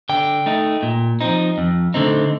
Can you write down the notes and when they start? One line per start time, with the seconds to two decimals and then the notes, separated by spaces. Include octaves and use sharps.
0.09 D3 G5
0.46 A3 D#4
0.83 A#2
1.21 F3 C4 D#4
1.58 F2
1.94 D3 A3 C4 D#4